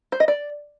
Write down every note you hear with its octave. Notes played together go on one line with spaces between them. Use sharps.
C5
D#5
D5